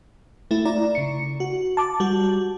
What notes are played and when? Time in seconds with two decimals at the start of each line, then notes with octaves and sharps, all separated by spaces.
0.51 A3 E4
0.65 E4 D5 A#5
0.95 C#3 C#7
1.40 F#4
1.77 A5 D6
2.00 G3 F#4